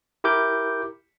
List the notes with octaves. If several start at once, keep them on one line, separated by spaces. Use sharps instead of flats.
E4 G4 A#4 D6 G6